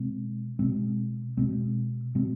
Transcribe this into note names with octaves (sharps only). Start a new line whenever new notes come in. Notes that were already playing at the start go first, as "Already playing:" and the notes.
Already playing: B2 G#3 C4
B2 G#3 C4
B2 G#3 C4
B2 G#3 C4